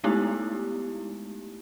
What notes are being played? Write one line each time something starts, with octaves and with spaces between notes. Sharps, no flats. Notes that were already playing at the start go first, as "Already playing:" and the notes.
G#3 A3 B3 D#4 E4 G4